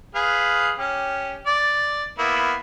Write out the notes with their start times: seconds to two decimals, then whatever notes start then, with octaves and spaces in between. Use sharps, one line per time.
0.15 G#4 B4 F5
0.78 C#4 G4
1.47 D5
2.18 A#3 B3 E4